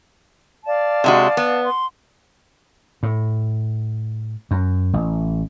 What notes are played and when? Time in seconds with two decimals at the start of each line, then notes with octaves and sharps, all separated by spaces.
0.66 D5 F5 A5
1.04 C3 G#3 F#4
1.37 B3
1.65 C6
3.03 A2
4.51 F#2
4.93 A1